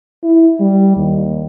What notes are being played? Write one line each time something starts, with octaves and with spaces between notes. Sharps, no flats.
E4
G3
D#2